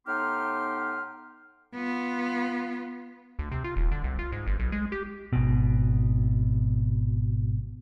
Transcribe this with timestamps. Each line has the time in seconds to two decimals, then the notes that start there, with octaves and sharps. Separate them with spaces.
0.07 A2 B3 D#4 G4 C6 F6
1.74 B3 F4
3.39 D2
3.52 C3
3.64 F4
3.76 D#1
3.92 D3
4.04 C2
4.19 F4
4.32 G#2
4.47 G1
4.59 B1
4.72 G#3
4.92 G4
5.33 G#1 B2